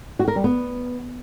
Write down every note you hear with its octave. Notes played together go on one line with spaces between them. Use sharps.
F#4
A#4
G3
B3